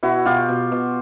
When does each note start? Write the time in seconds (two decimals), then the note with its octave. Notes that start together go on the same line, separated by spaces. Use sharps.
0.03 B2 E4 F#4
0.25 B2 F4 G4
0.49 B2
0.72 B2